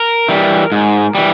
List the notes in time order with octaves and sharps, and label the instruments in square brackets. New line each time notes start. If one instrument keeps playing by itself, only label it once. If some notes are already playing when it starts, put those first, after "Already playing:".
Already playing: [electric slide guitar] A#4
E3 G3
G#2
E3 G3